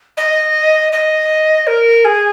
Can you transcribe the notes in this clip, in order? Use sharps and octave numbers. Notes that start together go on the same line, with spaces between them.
D#5
D#5
A#4
G#4